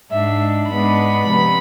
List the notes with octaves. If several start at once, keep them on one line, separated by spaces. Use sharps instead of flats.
G#2 G#3 D4 E5
G#2 G#3 B3 D4 B5
C3 F3 B3